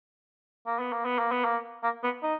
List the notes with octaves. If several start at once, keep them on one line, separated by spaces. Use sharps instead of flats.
A#3
B3
A#3
B3
A#3
B3
A#3
A#3
B3
D#4